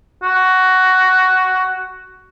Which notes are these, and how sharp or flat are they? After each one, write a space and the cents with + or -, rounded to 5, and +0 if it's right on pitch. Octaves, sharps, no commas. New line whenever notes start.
F#4 +10